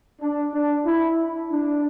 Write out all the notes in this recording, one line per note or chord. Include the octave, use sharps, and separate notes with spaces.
D4
D4
E4
D4